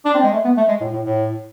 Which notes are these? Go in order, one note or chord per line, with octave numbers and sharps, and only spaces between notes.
D4
C4
G#3
A3
B3
A3
G#3
A2
A2
A2